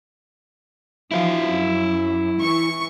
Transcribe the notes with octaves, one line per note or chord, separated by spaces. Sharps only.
E3 F3 E4 F5
F#2
E3 C#6